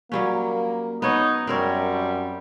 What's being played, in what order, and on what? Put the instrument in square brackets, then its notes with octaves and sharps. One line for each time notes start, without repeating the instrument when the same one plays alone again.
[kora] F#3 G3 C#4 [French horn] A#3
[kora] B3 C#5 [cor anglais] D#4
[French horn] F#2 [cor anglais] G3 [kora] C4 A#4 C#5